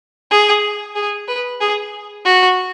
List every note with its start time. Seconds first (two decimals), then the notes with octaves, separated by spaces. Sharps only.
0.31 G#4
0.95 G#4
1.28 B4
1.61 G#4
2.25 F#4